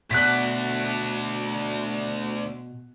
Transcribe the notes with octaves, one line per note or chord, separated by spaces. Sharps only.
D2 B2 D4 F#6 B6